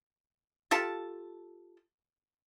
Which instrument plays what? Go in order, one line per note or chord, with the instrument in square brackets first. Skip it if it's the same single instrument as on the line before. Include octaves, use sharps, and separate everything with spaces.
[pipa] F4 G4 A4 A5